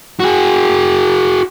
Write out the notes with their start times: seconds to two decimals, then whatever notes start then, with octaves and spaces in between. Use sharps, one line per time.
0.20 F#4 G#4